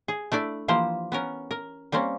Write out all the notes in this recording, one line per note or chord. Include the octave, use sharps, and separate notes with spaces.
G#4
A3 D4 E4 D5
E3 F3 A#3 G4 C5
B3 C#4 A#4
A#4
G3 A#3 C4 C#4